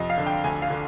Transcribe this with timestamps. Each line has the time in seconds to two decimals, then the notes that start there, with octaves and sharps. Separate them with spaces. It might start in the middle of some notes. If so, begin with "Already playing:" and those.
Already playing: F2 C3 D#5
0.10 F5
0.18 D3
0.26 G5
0.44 D2 G#5
0.62 F5
0.70 D3